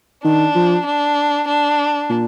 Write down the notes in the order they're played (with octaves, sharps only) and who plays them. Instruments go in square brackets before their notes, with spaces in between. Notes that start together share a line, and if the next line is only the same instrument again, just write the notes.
[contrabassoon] D#3 [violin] D4
[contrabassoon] F3
[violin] D4
D4
[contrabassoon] A#2